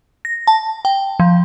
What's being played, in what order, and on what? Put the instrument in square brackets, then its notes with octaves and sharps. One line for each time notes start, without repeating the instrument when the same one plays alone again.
[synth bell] A#6
A5
G5
F3